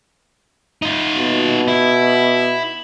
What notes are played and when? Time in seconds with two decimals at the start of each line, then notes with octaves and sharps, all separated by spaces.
0.82 D#4 F4
1.16 B2
1.68 E4